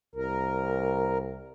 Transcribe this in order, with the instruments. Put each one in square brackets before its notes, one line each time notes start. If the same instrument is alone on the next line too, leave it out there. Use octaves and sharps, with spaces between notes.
[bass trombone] C2 [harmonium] A#4